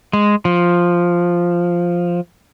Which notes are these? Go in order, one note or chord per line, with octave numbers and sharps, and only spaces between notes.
G#3
F3